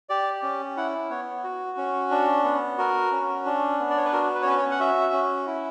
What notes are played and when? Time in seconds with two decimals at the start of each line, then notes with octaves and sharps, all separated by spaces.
0.09 G4 D5
0.43 C#4
0.77 E4 F#5
1.11 B3 C#5
1.44 F#4
1.77 C#4
2.11 D4
2.44 B3
2.78 F#4 A#4
3.12 C#4
3.45 D4
3.79 B3
3.90 D5
3.97 C#5
4.05 B4
4.13 F#4 A#4
4.35 B4
4.42 C#5
4.46 C#4 B4
4.58 C#5
4.71 F#5
4.79 F#4 E5
5.13 C#4
5.47 E4